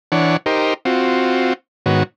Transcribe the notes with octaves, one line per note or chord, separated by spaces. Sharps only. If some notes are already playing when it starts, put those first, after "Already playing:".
E3 D4 C#5 F#5
D#4 G4 A#4 C5
C4 F4 F#4
G#2 D#3 B3 F#4 C#5